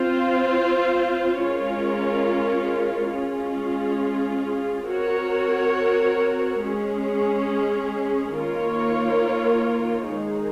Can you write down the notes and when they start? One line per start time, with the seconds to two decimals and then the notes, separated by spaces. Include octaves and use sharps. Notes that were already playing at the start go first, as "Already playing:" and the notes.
Already playing: C4 F4 C5
1.41 G#3 C#4 F4 A#4 C#5
3.14 G#3 C#4 F4 G#4
4.88 C4 F#4 A#4 C#5
6.62 G#3 C#4 G#4
8.35 D#3 A#3 F4 A#4 C#5
10.09 D#3 G#3 D#4 G#4